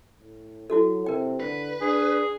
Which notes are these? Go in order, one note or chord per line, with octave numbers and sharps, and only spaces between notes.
A2
F#3 E4 F#4 A4
C3 A#4 G5
D3 B4
D4 G#4